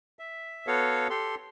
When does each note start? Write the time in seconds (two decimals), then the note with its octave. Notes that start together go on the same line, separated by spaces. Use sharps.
0.19 E5
0.67 B3 F#4 A4 C#5 F5
1.10 G4 A4 C6